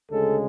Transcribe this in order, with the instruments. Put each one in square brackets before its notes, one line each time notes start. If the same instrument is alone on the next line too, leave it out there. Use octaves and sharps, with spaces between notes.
[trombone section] D2 C#3 G#3 A4